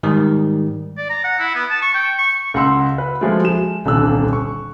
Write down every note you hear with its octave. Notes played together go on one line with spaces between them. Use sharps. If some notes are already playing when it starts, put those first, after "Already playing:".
G#2 D#3 G3
D5
A#5
F#5
E4
B3
A5
C#6
G5
C#6
C#2 F#5 C6 E6
B4
F3 G#3 A3
G#3 E7
D#1 C2 D3 E6 F#6
C#6